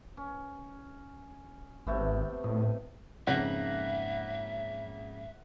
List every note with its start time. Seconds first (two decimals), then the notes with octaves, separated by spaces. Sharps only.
0.17 C#4
1.87 G#1 C3 A3 B3
2.44 A2 D#5
3.27 F2 G#2 C#3 A#3 E5 F#5